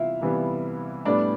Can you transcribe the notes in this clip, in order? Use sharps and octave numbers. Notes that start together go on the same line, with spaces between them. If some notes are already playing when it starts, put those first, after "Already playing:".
Already playing: C3 E3 G3 B3 E4 F4 E5 F5
C3 E3 G3 B3
A2 G3 B3 D4 D5